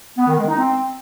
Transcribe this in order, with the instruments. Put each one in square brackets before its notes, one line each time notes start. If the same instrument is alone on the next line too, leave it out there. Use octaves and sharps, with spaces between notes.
[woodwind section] B3
D#3
G#3
D#4
C4